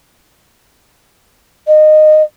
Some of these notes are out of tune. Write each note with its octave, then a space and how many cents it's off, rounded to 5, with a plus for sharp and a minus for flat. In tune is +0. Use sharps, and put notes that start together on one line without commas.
D#5 -20